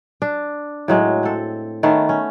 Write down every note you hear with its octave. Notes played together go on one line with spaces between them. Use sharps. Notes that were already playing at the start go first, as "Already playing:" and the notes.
D4
A2 F#3 G#3
C4 A4
D#3 A3 B3 C#4
C#4